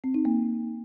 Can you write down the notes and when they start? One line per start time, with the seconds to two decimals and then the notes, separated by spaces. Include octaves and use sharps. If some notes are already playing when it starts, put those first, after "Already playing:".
0.04 C4
0.14 D#4
0.25 A#3